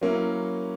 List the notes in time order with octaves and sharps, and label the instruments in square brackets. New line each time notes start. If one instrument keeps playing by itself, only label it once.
[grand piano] F#3 A#3 C#4 E4